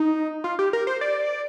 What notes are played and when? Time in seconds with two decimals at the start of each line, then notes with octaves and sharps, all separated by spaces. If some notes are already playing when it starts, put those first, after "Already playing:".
Already playing: D#4
0.44 F4
0.59 G4
0.73 A#4
0.87 C5
1.01 D5